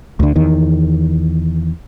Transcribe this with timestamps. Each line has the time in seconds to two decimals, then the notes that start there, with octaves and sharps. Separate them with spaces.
0.20 D2 D3
0.36 E2 D#3